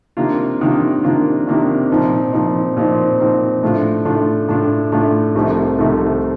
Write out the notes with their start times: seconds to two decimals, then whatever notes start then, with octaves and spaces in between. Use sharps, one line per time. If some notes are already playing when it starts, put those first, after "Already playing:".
0.17 C3 D#3 A#3 D4 F4
0.61 C3 D#3 A#3 D4 F4
1.04 C3 D#3 A#3 D4 F4
1.47 C3 D#3 A#3 D4 F4
1.90 A#2 F3 C4 D#4
2.33 A#2 F3 C4 D#4
2.76 A#2 F3 C4 D#4
3.19 A#2 F3 C4 D#4
3.63 A2 A3 D4 F4
4.05 A2 A3 D4 F4
4.49 A2 A3 D4 F4
4.92 A2 A3 D4 F4
5.35 C2 C3 F3 A3 D#4
5.79 C2 C3 F3 A3 D#4